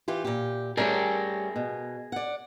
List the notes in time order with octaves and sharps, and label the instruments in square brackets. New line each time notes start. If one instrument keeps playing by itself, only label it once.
[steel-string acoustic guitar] E3 F4 G4
A#2 G4
[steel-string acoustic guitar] G3 A3 C#4 [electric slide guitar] G#4 A#4
[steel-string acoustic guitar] B2
D5 F#5